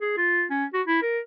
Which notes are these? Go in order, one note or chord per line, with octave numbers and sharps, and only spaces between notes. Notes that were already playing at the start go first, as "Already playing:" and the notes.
G#4
F4
C#4
F#4
E4
A#4